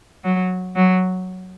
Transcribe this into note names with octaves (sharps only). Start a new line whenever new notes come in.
F#3
F#3